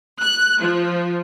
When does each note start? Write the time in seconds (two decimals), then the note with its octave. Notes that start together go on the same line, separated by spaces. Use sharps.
0.22 F#6
0.59 F3